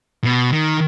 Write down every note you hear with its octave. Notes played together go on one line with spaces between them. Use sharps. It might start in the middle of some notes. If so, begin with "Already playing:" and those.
B2
D#3